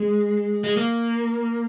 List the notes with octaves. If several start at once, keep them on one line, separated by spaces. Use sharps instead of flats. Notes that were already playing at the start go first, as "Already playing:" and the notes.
Already playing: G#3
G#3
A#3